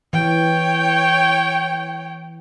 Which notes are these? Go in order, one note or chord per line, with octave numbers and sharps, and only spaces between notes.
E3 C#5 G5